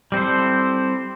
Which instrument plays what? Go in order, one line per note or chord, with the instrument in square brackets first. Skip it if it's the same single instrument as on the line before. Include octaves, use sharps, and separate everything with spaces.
[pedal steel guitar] G3 C4 E4 A4 C5